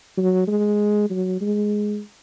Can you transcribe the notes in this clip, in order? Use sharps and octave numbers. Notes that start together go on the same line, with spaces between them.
F#3
G#3
F#3
G#3